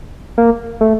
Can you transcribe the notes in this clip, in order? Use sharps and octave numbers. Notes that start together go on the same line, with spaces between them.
A#3
A3